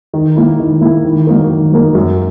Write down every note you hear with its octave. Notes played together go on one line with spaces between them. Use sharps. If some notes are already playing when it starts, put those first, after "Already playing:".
D#3
A#3 E4
D#3
A#3 E4
D#3
F#3 A#3 D#4 A#4
D#3
F#3 A#3 D#4 A#4
F#2